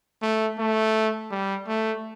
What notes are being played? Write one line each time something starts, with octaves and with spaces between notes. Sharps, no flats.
A3
A3
G3
A3